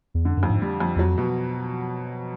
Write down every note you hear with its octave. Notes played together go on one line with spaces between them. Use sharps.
E2
F2 D3
F#2
F2
G#2
G3
F2
E2 F#3
F2
B2